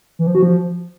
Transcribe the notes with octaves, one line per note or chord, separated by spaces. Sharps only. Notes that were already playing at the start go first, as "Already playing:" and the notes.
E3
F3
F#4
F3